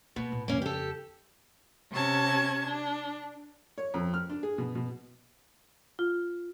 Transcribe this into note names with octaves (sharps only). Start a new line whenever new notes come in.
B2 A#3 B3
A2
F2 C#3 A#3 C#4
G4 A4
C3 C#4 A5 G#6
D4
C#5
F2
F6
D4
G#4
B2
B2
F4